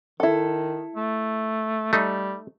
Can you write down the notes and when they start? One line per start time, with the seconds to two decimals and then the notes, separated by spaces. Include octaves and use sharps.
0.20 D#3 E4 A4
0.96 A3
1.93 G3 A3 D#4